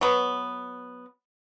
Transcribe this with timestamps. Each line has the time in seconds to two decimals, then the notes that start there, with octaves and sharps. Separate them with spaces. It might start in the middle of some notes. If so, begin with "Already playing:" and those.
0.01 F#3 B3